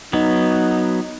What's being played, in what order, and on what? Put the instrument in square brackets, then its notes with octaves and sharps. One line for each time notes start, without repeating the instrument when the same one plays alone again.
[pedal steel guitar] F#3 B3 [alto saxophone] D#4